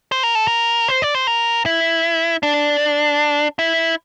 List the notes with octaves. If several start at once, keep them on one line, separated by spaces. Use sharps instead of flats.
C5
A#4
A4
A#4
C5
D5
C5
A#4
E4
D4
E4